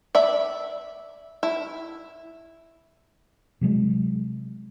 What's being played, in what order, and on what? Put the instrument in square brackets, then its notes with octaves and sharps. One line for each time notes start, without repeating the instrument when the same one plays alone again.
[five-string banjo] D5 E5 B5
E4
[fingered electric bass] C3 F#3 G#3